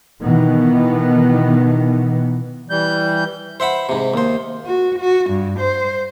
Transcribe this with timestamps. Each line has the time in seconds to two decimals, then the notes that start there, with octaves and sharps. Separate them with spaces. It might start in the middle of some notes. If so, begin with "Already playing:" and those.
0.22 B2 D#3 E3 B3
2.70 E3 G3 G6
3.60 C5 E5 F#5 B5
3.89 G#2 C3
4.14 D#2 C5
4.66 F#4
4.98 F#4
5.30 G2
5.59 C5